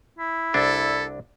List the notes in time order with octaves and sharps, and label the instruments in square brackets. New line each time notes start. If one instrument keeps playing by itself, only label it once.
[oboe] E4
[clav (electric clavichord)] C2 D4 [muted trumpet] A4